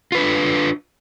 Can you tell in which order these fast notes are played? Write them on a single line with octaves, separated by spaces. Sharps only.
F4 B4 D4